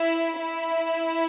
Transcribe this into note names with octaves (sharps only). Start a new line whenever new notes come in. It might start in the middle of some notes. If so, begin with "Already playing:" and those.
Already playing: E4
E4